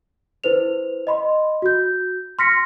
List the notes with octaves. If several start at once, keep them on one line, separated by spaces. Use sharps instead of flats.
E4 B4 C5 F7
D#5 B5 C6
F#4 G6
C6 F6 A#6 B6 C#7